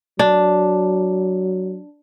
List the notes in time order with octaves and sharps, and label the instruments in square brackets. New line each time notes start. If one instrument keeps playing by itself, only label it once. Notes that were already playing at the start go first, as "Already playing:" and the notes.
[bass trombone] F#3 [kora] D4